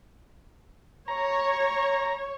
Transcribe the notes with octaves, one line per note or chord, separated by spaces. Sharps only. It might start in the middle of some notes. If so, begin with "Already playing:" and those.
C#5 A#5